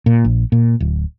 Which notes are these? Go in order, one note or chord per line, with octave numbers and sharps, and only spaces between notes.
A#2
A#1
A#2
D1